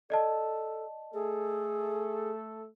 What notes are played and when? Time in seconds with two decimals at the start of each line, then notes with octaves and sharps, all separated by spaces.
0.10 A4 D5 D#5 A5
1.14 A3 G#4 A4